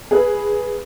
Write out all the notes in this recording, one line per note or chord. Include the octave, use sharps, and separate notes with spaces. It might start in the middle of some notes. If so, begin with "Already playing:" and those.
G#4 B4